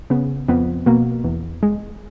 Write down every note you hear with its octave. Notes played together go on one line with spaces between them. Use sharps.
C#3 B3
F2 B3
B2 A#3
E2
G#3